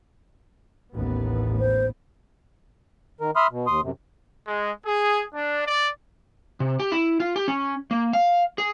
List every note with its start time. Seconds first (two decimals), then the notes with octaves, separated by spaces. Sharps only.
0.93 A1 D#2 B3
1.59 C5
3.20 D#3 A#4
3.36 E5 B5 C6 D#6 F6
3.51 B2
3.67 D#2 C6 D#6
3.82 F#2 C3
4.46 G#3
4.85 G#4
5.33 D4
5.66 D5
6.60 C3
6.80 G4
6.92 E4
7.20 F4
7.36 G4
7.48 C#4
7.91 A#3
8.13 F5
8.58 G#4